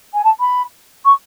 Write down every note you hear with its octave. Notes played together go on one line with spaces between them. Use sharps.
G#5
A5
B5
C#6